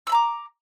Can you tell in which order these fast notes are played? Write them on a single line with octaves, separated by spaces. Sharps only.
E6 B5 A#5 D6